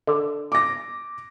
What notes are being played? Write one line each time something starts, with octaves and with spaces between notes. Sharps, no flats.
D3
D6 A#6